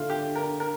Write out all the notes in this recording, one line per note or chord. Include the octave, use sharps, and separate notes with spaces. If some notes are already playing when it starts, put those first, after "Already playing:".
Already playing: D3 A3 F4
G4
A#4
A#4